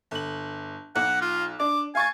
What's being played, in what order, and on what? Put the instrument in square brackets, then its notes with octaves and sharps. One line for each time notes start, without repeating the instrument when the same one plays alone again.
[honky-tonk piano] G1 F#7
[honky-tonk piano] B1 [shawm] F#5
[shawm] F4
[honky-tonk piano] D4 [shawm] D6
[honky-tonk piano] F5 C#6 A6 [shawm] G#5